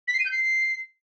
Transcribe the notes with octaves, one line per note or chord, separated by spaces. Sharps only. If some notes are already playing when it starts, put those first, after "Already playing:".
B6
C7
D#7
G6
C7